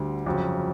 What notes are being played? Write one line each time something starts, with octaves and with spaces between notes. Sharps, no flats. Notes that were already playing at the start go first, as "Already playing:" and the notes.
Already playing: D2 D3 G3
G1 F2 C#3 F#3